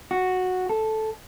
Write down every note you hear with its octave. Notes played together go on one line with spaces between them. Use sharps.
F#4
A4